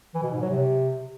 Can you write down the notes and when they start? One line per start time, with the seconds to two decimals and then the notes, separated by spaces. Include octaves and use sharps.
0.14 E3
0.23 B2
0.32 G#2
0.41 F#3
0.50 C3